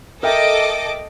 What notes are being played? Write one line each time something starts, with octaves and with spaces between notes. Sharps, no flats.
A4 A#4 D#5 E5 G5 D6